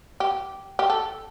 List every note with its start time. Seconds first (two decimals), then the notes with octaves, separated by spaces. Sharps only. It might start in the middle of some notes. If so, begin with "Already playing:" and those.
0.20 G4
0.79 G4
0.90 A4